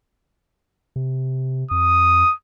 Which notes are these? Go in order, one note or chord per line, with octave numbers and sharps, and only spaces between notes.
C3
F2 D#6